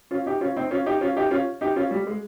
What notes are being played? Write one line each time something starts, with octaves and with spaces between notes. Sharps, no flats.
C#4 F4
D#4 G4
C#4 F4
C4 D#4
C#4 F4
D#4 G4
C#4 F4
D#4 G4
C#4 F4
D#4 G4
C#4 F4
G3
G#3